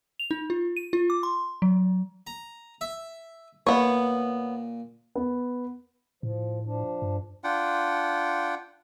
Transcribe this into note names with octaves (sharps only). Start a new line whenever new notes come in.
F7
D#4
F4
D#7
F4
D6
C6
F#3
A#5
E5
A#2 B3 C#5
B3
A2 F3
F3 D4
G2
D4 F4 F#5 G5